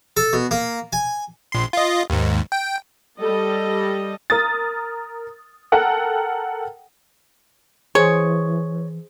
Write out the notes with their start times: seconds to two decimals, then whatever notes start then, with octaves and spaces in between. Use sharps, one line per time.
0.17 A4
0.33 B2
0.51 A#3
0.93 G#5
1.52 A#1 C6
1.73 F4 D#5
2.10 D#2 G#2
2.52 G5
3.19 G3 A4 D#5
4.30 A#4 D#6 A6
5.72 A4 A#4 F#5 G5
7.95 E3 G#4 C5 C#5